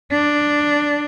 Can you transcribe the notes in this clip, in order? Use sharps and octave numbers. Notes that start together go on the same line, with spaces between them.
D4